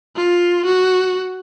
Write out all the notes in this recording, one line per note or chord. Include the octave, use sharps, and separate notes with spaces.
F4
F#4